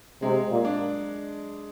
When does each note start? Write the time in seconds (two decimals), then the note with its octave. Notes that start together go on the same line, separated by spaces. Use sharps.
0.22 C3 G#3
0.51 A#2
0.65 D4